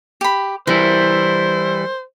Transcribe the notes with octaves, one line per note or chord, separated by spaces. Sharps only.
G4 B5
E3 G3 E4 A#4 C5